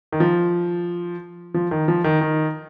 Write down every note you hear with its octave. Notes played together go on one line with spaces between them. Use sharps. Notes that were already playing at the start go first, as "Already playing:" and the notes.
D#3
F3
F3
D#3
F3
D#3
D#3